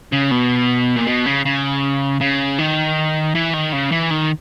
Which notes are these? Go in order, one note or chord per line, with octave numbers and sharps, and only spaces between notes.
C#3
B2
A#2
B2
C#3
C#3
C#3
D#3
E3
D#3
C#3
E3
D#3